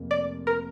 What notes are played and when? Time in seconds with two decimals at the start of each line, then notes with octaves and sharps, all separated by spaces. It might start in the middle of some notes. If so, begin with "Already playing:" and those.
Already playing: F1 F2 C3 A#3
0.11 D5
0.47 A#4